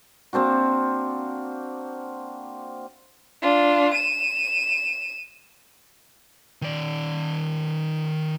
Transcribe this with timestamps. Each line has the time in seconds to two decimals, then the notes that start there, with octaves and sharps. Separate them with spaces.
0.33 A#3 C4 D4 F#4
3.42 D4 F4
3.94 D#7 E7
6.62 D#3 D5